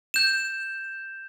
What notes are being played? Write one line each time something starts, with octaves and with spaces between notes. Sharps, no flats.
G6 E7